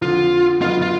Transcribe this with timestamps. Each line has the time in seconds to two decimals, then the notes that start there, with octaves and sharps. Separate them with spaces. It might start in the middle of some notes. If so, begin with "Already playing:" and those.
0.01 F2 D3 F3 F4
0.61 F#2 D3 F#3 B3 D#4 F4
0.82 F4